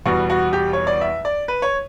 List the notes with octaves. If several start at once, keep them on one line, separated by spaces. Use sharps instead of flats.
E2 B2 G3 B3 F#4
F#4
G4
C#5
D5
E5
D5
B4
C#5